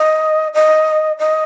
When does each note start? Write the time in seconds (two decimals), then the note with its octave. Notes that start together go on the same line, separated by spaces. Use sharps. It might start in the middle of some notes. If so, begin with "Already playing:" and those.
Already playing: D#5
0.54 D#5
1.19 D#5